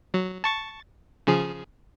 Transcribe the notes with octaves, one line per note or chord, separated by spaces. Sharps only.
F#3
A5 C#6 A6
C#3 F3 G#4